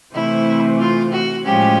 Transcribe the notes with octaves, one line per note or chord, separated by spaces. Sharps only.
C3 E3 A3 C4 E4
F4
F#4
A2 F3 G#3 C#4 G4